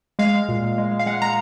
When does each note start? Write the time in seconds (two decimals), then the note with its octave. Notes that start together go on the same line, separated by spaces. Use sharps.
0.19 G#3 F5
0.34 G#3
0.49 A#2
0.63 A#2
0.78 G#3
0.91 G#3
0.99 F5
1.06 G#3 F#5
1.22 G#3 A#5